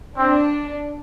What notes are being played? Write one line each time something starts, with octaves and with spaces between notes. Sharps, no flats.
C4 D4